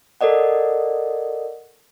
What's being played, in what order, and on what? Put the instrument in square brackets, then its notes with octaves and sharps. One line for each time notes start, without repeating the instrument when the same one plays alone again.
[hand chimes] A4 A#4 D5 D#5 F#5